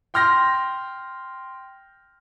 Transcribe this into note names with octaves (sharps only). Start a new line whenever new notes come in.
G5 C6 F6 G6 A#6